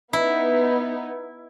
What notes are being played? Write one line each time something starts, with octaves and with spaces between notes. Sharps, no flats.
B3 D#4 E4